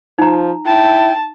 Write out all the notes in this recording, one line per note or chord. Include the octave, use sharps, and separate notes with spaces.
F3 D#4 A#5
E4 G5 A5